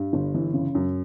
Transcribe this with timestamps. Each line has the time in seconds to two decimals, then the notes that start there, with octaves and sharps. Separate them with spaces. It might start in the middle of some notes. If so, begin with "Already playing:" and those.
Already playing: G2
0.13 G1
0.34 E3
0.54 C#3
0.75 F#2